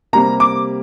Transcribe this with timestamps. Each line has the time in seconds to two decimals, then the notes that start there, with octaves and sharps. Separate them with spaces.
0.13 C3 G3 A#3 A#5
0.40 D6